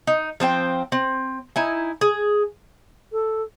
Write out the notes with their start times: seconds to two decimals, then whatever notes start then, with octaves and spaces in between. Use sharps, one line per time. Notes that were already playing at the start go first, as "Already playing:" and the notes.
0.07 D#4
0.40 F3 C4 C5 G5
0.92 C4
1.56 D#4 E4 G#5
2.01 G#4
3.12 A4